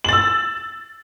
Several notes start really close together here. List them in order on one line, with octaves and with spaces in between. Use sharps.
F#7 A6 E6